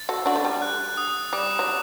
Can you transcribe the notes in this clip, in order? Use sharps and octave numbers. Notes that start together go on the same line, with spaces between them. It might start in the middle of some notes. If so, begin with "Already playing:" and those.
Already playing: A6
F#4 A4
D4 F#4
A3
G3
F#6
D#6
G3 D6
F#3